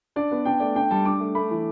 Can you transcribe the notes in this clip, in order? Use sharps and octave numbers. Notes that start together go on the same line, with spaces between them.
D4 D5
B3
D4 G5
A3 D5
D4 G5
G3 A5
D4 D6
A3
A3 B5
E3